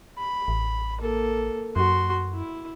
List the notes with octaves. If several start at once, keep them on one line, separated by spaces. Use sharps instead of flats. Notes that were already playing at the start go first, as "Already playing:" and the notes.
B5
A1
A#3 A4
F#2 F#4 C6
E4